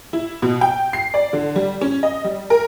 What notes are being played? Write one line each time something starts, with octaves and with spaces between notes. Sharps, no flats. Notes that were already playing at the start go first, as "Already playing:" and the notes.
E4
B2
G5
C7
D5
D3
G3
C#4
D#5
G3
A#4